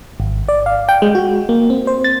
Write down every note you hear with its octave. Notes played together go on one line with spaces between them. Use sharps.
G#1
D5
F5
G5
G#3
F#4
A#3
C4
C5
A6